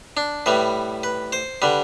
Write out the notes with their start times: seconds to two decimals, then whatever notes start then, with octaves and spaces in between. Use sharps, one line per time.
0.17 D4
0.46 A2 E3 G3 B4
1.03 B4
1.32 C5
1.62 D3 G3 B4